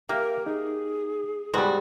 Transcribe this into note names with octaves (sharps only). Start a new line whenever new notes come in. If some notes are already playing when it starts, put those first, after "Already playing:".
A#3 G4 A#4 E5 F5
D#4 G#4
G#2 G3 B3 F#4 D5 G5 B5